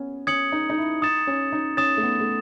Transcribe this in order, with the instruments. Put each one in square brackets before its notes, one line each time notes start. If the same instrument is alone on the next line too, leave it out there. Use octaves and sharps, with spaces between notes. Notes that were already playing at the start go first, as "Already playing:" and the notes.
Already playing: [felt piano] B3 C#4
[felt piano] C#4 [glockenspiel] D#6 G#6 C#7 F#7
[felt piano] D#4
D#4
E4
[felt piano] D#4 [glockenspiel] D#6 A6 E7
[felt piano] C#4
D#4
[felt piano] C#4 [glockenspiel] D#6 A6 E7
[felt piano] A3
B3
A3